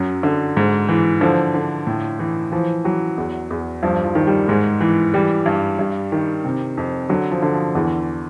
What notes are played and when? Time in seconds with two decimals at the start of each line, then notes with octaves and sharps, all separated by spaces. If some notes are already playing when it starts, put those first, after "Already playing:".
Already playing: F#2 F#3
0.23 D3
0.57 G#2
0.89 E3
1.21 D3 F3
1.54 D3
1.87 A2
2.19 E3
2.52 E3 F3
2.85 E3 F#3
3.18 E2
3.51 E2
3.83 G2 F3
4.04 F3
4.15 D#3
4.27 G3
4.48 G#2 G#3
4.81 E3
5.14 E3 G3
5.46 G2
5.79 G2
6.12 D#3
6.44 C3
6.77 F2
7.09 D3 F#3
7.31 F3
7.42 D3
7.54 F3
7.75 E2 E3